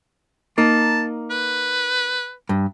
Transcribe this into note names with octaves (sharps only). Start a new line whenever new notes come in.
A#3 D#4 A5
B4
G2